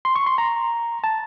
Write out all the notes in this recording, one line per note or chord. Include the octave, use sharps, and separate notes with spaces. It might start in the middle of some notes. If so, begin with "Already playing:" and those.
C6
C#6
C6
A#5
A5